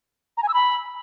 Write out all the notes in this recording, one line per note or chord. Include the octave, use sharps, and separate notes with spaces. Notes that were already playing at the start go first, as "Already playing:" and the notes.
A#5
G#5
E6
B5